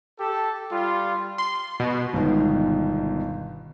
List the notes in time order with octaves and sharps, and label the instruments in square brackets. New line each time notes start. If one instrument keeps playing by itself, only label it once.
[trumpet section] G4 A4 A5
G3 F4
[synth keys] C6
B2
[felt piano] G1 G#2 B2 D#3